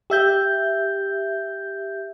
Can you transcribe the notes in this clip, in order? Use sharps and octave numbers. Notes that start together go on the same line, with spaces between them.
G4 E5 G6